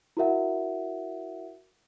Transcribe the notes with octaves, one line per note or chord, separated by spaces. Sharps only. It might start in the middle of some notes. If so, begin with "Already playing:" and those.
E4 F#4 A#4 E5 F#5